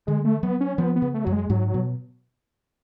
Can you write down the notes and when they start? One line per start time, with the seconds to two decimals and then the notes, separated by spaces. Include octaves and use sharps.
0.07 D3 G#3
0.25 A3
0.43 F#3 B3
0.61 C#4
0.78 F3 B3
0.96 B3
1.02 C#3
1.14 A3
1.25 F#2 F#3
1.32 G#3
1.50 G#2 F#3
1.68 F#3
1.74 B2